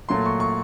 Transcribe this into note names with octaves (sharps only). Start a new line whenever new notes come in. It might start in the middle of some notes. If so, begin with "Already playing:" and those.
A#2 F#3 A3 C6
C#6
C#6